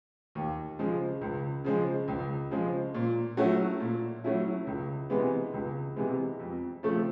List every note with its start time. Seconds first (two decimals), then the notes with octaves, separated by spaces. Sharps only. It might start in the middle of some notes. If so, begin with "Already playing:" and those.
0.35 D#2
0.79 C#3 F3 G#3
1.22 C#2
1.65 C#3 F3 G#3
2.08 C#2
2.51 C#3 F3 G#3
2.94 A#2
3.37 F#3 A3 C#4 E4
3.80 A#2
4.24 F#3 A3 C#4 E4
4.67 C#2
5.10 C3 E3 G#3 B3
5.54 C#2
5.96 C3 E3 G#3 B3
6.39 F2
6.83 C#3 F3 A3 C4